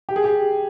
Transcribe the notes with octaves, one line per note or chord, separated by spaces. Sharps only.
G4
G#4
G4